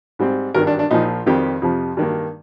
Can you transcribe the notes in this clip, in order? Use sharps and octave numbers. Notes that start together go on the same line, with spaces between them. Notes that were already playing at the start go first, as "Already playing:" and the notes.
G#2 G3 C4
G#1 G2 D#3 A#4
D4
D4
A#1 A#2 F3 D#4
F2 D#3 G3 C4 G4
F2 C3 F3
G2 D#3 A#3